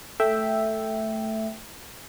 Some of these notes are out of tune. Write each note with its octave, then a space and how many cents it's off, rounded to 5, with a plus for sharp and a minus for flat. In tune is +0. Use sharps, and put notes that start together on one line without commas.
A3 +0 E5 +0 G5 +0